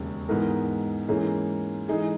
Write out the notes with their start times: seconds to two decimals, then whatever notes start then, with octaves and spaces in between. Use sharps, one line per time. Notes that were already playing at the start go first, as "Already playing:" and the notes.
Already playing: E1 D#2 C#3
0.29 G#2 E3 B3 D#4 A#4
1.08 G#2 E3 A#3 C#4 G#4
1.88 E3 G#3 D#4 G#4